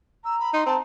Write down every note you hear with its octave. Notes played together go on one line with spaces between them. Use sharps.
A#5 E6
B5
D#4 C6
C4 A5